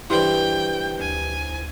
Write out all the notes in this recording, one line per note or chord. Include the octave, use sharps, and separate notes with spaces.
G2 E3 E4 C5 G5 C6
D2 G#5